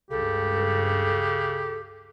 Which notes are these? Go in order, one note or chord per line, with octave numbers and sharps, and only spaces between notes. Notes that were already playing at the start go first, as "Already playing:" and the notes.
C#2 G2 C#3 G4 A4